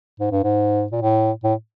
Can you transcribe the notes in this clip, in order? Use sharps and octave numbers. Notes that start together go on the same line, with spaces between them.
G#2
G2
G#2
A#2
A2
A2